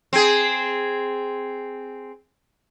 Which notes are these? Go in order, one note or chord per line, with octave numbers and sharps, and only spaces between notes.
C4 G#4